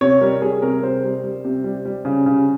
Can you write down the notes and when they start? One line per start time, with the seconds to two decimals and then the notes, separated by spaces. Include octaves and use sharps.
0.01 C3 C#5
0.21 G3 A#4
0.42 G3 G#4
0.62 C3 A#4
0.83 C3 C5
1.04 G3
1.24 G3
1.45 C3
1.64 G3
1.85 G3
2.05 C#3
2.26 C#3